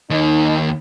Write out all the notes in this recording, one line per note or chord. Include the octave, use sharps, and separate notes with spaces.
D#2 D#3 D#4